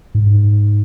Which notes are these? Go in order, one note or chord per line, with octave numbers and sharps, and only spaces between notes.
G#2